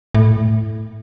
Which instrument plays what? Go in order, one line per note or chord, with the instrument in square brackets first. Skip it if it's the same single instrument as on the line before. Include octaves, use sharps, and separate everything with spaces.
[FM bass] A2